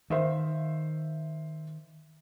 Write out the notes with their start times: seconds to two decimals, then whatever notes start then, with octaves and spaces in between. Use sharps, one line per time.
0.10 D#3 C5 E5 F5